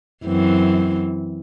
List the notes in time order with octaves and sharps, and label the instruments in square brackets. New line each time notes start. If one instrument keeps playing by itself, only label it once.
[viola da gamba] F#2 E3 C4